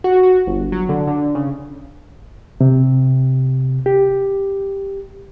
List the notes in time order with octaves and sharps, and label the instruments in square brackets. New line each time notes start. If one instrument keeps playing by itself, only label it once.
[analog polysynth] F#4
F#4
G1
F#3
D3
D3
C#3
[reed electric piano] C3
G4